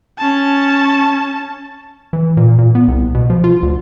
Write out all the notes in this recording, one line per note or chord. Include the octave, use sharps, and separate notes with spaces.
C#4 A5
E3
A#2
A#2
B3
C2
B2
F3
F4
D2